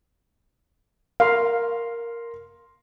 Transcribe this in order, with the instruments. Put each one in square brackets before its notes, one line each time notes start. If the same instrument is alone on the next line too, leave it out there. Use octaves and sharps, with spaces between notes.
[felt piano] A#4 C6 [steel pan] F5